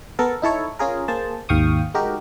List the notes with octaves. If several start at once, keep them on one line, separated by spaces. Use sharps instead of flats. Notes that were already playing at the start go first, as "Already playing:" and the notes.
B3 A4 A#4
D#4 E4 A4 C#5
C#4 F4 G#4 A#4
A#3 G#4 C5 A5
G#1 D#2 F5 G5 C#6 D#6
G#3 D#4 F#4 G4 A#4